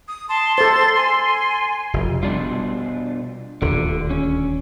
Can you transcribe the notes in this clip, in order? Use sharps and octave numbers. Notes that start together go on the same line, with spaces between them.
D#6
A5 C6
A4 C5 A6
G#5
F1
B2 G3 D4 F4
D#1 D2 D3
C#4